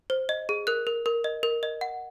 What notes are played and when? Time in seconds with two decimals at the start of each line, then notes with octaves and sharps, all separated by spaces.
0.10 C5
0.29 D#5
0.49 G#4
0.67 A#4 F#6
0.87 A#4
1.06 A#4
1.24 D#5
1.43 A#4
1.63 D#5
1.81 F#5